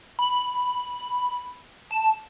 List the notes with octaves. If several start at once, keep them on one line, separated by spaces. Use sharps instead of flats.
B5
A5